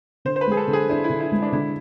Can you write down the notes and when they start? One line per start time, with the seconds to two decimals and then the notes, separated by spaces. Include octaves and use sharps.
0.25 D3 C5
0.36 C5
0.41 B4
0.47 G#3 G#4
0.57 A4
0.67 D3
0.73 G#4
0.89 D4 E4
1.04 E4
1.10 D3
1.20 E4
1.32 G#3
1.42 D4
1.52 D3 E4